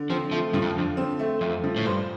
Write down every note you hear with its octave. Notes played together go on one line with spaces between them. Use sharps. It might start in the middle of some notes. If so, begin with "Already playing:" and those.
Already playing: D3
F3 C4
F3 A3
G2 F3
F2
F2 D3
C4
A3
F2 A3
F3
A2
G2 C5